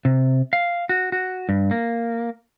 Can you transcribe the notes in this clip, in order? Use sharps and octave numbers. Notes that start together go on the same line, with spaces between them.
C3
F5
F#4
F#4
G2
A#3